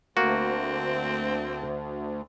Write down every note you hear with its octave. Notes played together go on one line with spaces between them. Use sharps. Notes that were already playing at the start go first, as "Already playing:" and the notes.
D2 A#3 C4 F#4